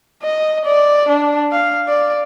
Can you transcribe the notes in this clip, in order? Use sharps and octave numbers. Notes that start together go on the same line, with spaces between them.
D#5
D5
D4
F5
D5